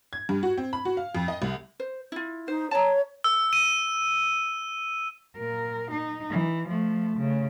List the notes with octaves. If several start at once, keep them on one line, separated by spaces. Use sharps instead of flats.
G#6
G2
F#4
C4
B5
F#4
F5
F2
D#5
C2
C5
E4 F4
D#4 C5
C#5 A5 A#5
E6
D#7
A#2 A#4
D#4
E3
F3 A3
C#3 A3